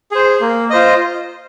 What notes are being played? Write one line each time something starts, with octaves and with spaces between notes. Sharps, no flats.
G#4 C5
A#3
F4 C5 D#5